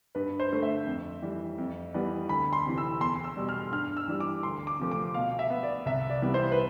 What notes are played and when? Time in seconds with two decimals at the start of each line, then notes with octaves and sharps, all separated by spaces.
0.15 G2 B4
0.40 C5
0.52 D3 A3
0.62 E5
0.86 F2
1.22 E3 G3
1.58 F2
1.94 E3 G3 B3
2.29 D2 B5
2.53 C6
2.66 C3 E3
2.78 E6
3.00 E2 C6
3.24 E6
3.37 B2 G3
3.49 F6
3.72 G2 F6
3.97 E6
4.08 E3 G3
4.20 D6
4.43 D2 C6
4.67 D6
4.79 C3 F3 A3
4.92 D6
5.14 B2 F5
5.39 E5
5.50 B3
5.63 D5
5.86 C2 E5
6.10 D5
6.22 C3 E3 G3 B3
6.34 C5
6.52 B4